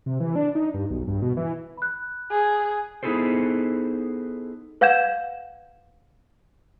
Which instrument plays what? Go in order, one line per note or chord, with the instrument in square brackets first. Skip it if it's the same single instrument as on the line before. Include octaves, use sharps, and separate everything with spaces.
[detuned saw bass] C3
E3
D4
D#4
G2
B1
G2
B2
E3
[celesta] B5 F#6
[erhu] G#4
[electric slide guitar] B3 D#4 E4 G#4 A4 C5
[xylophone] B4 F5 F#5 G6 G#6 E7